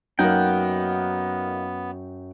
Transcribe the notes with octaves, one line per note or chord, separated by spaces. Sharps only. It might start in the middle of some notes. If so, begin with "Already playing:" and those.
F#2 A#3 B3 D#4 F#5 G5